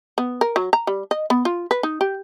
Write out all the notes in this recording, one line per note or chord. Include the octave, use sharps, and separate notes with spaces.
B3
A#4
F#3
A#5
G3
D#5
B3
F4
B4
D#4
G4